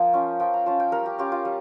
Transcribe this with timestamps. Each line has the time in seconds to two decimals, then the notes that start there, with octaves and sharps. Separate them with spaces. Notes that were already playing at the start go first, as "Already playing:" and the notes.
Already playing: F3 A#3 G5
0.13 C#4 F4
0.40 F3 G5
0.54 A#5
0.66 C#4 F4 A5
0.80 G5
0.92 G3 A#4
1.06 G4
1.18 C#4 F4 G4
1.32 F4
1.45 G3